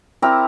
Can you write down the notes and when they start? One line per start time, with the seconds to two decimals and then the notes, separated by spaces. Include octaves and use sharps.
0.22 C4 E4 G4 A#4